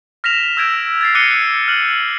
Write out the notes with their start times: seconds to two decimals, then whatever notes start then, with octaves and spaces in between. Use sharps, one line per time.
0.24 F6 A#6 B6 E7 F7
0.57 E6 G6 G#6 D7 F7
1.01 G#6 A6 C7
1.15 D6 F#6 A#6 C#7 D#7 G7
1.68 F6 F#6 F#7
1.89 F#7